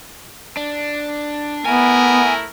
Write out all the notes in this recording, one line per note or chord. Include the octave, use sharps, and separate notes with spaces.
D4
A3 B3 E4 A#4 G#5